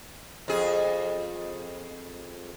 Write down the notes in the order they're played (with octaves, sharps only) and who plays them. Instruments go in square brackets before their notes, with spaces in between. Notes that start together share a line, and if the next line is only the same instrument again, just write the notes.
[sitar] F2 G#4